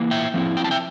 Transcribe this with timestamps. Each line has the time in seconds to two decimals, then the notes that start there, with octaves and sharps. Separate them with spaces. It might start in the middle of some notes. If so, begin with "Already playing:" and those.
Already playing: E3 A#3
0.11 E5 G5
0.34 F3 C4 E4
0.57 G5
0.64 A5
0.71 E5 G5